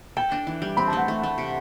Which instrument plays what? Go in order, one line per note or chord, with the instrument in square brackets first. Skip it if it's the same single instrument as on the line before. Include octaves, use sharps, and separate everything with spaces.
[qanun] A4 [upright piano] G5
[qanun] D4
E3
G3
[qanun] C4 [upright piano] B5
[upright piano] A5
[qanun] A3 [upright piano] F#5
[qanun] A3
A3
C3